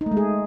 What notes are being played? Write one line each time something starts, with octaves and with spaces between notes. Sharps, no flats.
D#4
A3
G#3
G#4